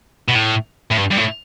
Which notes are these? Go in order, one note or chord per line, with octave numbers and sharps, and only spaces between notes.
B2
A2
A2
G2
G2
A2